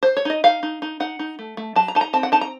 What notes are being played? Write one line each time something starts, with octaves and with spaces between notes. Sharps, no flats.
C5
C#5
D#4 D#5
D#4 F5
D#4
D#4
D#4 F#5
D#4
A3
A3
F#3 A5
A#5
D#4 A5
A#5
C4 A5
F#5
D#4 A5
A#5